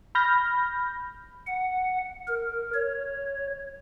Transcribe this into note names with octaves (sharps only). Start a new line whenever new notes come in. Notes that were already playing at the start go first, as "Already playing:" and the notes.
B5 F6 G6 A#6
F#5
A#4
C#5